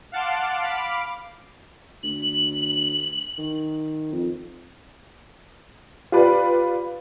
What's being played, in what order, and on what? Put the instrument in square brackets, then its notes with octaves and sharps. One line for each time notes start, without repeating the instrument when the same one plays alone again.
[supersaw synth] F5 F#5 A5 C6 D6
F5 B5 D6
[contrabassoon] D2 [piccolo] F#7
[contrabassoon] D#3
F2
[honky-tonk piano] F4 G4 B4 D5